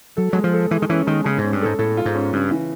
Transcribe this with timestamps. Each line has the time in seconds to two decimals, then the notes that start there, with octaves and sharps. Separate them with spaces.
0.17 F#3 A4
0.33 F#3 G#3
0.44 F3
0.53 A4
0.71 E3 G#3
0.82 D#3
0.89 E3 C#4
1.07 D#3 G#3
1.24 C#3 G#3
1.38 G#2
1.43 C#4
1.52 G2
1.62 G#2 A4
1.79 A2 A4
1.97 F4
2.05 G#2
2.14 C#4
2.33 G2 C#3
2.51 E3